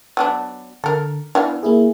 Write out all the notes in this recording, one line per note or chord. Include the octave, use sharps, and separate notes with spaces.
F#3 B3 D4
D3 A4 A#4
E3 B3 D4 F5
A#3 E4 G#4